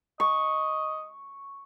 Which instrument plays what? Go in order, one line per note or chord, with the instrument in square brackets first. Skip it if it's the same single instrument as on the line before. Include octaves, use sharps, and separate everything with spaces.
[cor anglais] D#5 [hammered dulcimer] C#6